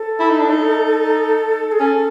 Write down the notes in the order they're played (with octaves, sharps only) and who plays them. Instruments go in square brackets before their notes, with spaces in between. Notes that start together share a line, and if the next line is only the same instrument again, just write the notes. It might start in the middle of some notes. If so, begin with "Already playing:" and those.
Already playing: [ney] A4
[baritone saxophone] E4
D#4
D4
D#4
[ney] G#4
[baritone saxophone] C#4 [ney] A4